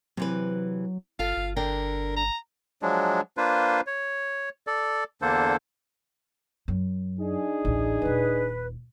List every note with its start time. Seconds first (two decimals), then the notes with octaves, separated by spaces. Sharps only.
0.17 C3 E3 F#3 B4
1.19 G1 F4 A4 F5
1.37 G1
1.56 D3 D4 A#4 G5
2.16 A#5
2.82 F3 F#3 G#3 D4
3.37 A#3 D4 F4 B4 C5
3.87 C#5
4.67 A4 D5
5.22 E2 D3 A#3 D4 A4 C5
6.68 F#2
7.19 D4 D#4 G#4
7.65 A1 D2
8.02 D#1 G#1 B4